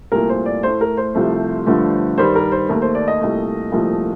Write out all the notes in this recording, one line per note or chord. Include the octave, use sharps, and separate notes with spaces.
C2 A#2 A3 A#4
C5
D5
A2 A3 C5
A#4
C5
C2 C3 F3 A3
G2 D3 F3 A3
G2 D#3 G3 C5
A#4
C5
D#2 D#3 A3 A#4
C5
D5
D#5
C2 A#2 A3
C2 A#2 F3 A3